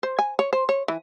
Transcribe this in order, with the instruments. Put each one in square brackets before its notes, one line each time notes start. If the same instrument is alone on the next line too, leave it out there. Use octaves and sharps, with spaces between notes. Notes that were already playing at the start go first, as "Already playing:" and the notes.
[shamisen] C5
G#5
C#5
C5
C#5
E3